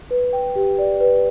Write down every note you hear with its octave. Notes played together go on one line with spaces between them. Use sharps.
B4
G5
G4
D5
B4